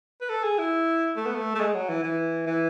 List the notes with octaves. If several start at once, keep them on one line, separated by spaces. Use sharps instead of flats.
B4
A4
G#4
E4
A3
B3
A3
A3
G#3
F#3
E3
E3
E3